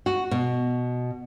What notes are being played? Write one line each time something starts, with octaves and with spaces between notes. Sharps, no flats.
F#4
B2